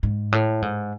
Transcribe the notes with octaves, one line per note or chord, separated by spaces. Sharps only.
G#2
A2
G#2